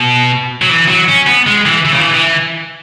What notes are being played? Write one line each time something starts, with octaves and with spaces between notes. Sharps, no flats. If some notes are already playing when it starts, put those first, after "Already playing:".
Already playing: B2
F#3
E3
F#3
C#4
B3
G#3
E3
E3
C#3
E3
E3